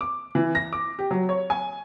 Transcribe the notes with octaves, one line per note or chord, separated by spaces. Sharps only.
D6
E3
A#6
D6
G4
F#3
C#5
G#5